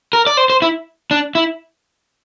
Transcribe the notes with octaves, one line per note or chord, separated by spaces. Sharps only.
A#4
D5
C5
C5
E4
D4
E4